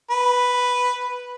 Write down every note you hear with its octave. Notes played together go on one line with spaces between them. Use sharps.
B4